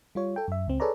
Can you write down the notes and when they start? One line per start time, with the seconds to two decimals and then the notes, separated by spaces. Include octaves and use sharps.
0.15 G3 F4 C#5
0.36 A4 G5
0.48 F#2 E5
0.67 C#2 C4
0.80 G#4 A4 B4 C#5 D5 A#5